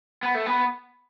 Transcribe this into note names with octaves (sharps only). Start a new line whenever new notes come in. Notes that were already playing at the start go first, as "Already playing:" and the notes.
B3
A3
B3